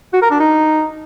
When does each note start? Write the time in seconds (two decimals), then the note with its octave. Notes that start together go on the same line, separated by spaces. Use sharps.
0.13 F#4
0.22 A#4
0.31 D4
0.40 D#4